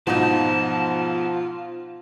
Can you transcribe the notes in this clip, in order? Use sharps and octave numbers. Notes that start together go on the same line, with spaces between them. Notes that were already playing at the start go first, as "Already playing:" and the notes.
G#2 B2 F3 F#3 D#4 F4 A5